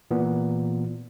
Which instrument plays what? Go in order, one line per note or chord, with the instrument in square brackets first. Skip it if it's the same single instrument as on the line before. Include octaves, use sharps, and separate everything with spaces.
[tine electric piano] A#2 E3 B3